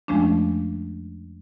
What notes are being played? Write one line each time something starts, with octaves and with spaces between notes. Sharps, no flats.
F2 F3 G#3 A3 C#4 D4